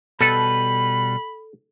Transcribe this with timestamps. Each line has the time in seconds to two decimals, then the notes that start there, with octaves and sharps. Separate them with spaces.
0.21 B2 G3 A4 B4 B5